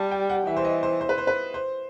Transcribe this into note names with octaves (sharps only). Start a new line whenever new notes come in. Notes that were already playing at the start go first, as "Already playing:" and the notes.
Already playing: G3 A5
G5
F#5
E3 E5
C5
D#5
C5
C5
B4
C5
B4
C5